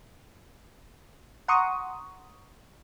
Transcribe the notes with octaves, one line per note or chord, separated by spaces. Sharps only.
F#5 A#5 C6 C#6 D#6